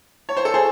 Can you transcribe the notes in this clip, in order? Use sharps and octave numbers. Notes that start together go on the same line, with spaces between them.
C#5
C5
A4
G#4 C5